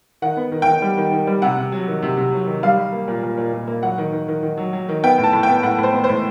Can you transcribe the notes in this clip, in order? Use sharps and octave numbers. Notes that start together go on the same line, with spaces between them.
D#3 F#5
B3
D#3
D#3 G5
G3
D#3
D#3
G3
C3 F#5
C3
F#3
D#3
C3
C3
F#3
D#3
G3 F5
G3
A#3
A#2
A#2
A#2
A#2
A#3
F#3 F#5
D#3
D#3
D#3
D#3
F#3
F#3
D#3
B3 G5
A2
A5
A2
G5
B3
A2 F#5
A2 C5
B3
A2 C5